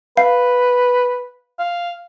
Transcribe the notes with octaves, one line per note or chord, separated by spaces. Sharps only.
B4 F5
F5